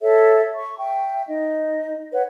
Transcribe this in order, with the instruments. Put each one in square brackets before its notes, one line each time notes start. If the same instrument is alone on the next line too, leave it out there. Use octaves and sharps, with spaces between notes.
[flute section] A4 C#5 E5
C#6
E5 G5
D#4 D#5
B4 C#5 F#5